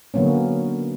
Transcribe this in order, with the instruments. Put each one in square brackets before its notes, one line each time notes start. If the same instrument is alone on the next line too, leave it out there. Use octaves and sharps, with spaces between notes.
[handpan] D3 F#3 A#3 B3 C#4